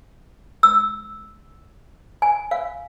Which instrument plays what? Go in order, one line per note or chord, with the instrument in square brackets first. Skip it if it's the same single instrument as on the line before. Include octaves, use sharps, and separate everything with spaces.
[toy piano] E6
G#5
F5